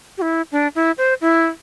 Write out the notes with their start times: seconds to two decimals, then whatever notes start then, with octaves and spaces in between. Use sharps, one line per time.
0.18 G4
0.22 E4
0.52 D4
0.75 E4
0.98 C5
1.21 E4